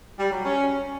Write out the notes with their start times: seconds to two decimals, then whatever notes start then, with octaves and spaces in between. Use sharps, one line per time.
0.20 G3
0.32 F#3
0.44 C#4